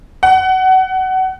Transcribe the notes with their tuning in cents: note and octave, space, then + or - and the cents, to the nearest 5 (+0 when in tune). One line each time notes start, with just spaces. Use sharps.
F#5 +25